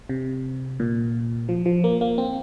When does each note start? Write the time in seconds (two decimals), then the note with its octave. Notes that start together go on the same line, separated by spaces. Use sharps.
0.09 C3
0.80 A#2
1.49 F3
1.66 F3
1.84 A#3
2.01 A#3
2.18 C4